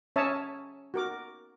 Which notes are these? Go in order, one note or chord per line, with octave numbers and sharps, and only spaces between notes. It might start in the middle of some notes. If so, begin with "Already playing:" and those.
C#4 C#5 E5 A5 A#5 D#6
F#4 A#4 D6